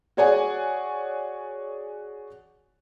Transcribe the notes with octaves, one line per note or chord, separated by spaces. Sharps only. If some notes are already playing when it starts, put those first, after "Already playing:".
F#4 G#4 C#5 D5 F#5 G#5